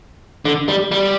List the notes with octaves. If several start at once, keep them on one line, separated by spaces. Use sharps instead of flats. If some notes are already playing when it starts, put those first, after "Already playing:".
D3
G3
G3